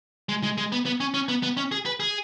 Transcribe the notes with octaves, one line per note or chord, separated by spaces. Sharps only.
G#3
G#3
G#3
B3
B3
C#4
C#4
B3
B3
C#4
G#4
B4
G#4